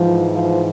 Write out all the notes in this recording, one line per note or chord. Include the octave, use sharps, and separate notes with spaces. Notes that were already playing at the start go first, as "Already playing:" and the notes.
Already playing: G#2 E3 F3
F3